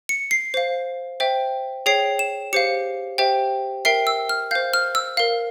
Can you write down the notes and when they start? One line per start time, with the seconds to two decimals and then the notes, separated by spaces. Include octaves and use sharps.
0.09 C#7
0.31 C7
0.54 C5 F5
1.20 C5 E5 G5
1.86 G#4 C#5 G5 C7
2.19 E7
2.53 G4 C5 F5 C#7
3.18 G4 C5 E5 G5
3.85 A#4 E5 G5 C7
4.07 E6
4.29 F6
4.51 C5 F5 G6
4.74 F6
4.95 E6
5.17 A#4 F5